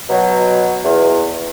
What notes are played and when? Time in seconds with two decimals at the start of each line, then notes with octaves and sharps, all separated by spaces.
0.10 B2 F#3
0.84 E2